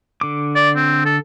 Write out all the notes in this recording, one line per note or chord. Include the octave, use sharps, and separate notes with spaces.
D3 D6
D5
C4
A4